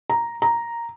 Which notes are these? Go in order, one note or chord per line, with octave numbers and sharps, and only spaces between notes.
A#5
A#5